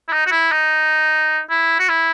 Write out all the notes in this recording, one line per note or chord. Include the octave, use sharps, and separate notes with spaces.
E4
D#4
F#4
E4
D#4
E4
F#4
E4